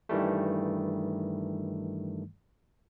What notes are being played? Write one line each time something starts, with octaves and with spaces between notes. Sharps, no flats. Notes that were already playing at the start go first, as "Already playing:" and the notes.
G2 D#3 E3 G3 A3